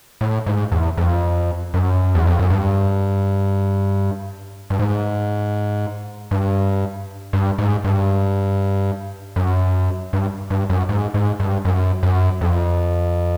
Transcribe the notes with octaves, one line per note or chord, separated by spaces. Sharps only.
A2
G#2
E2
F2
F#2
E2
F2
F#2
G2
G2
G#2
G2
G2
G#2
G2
F#2
G2
G2
F#2
G#2
G#2
G2
F#2
F#2
F2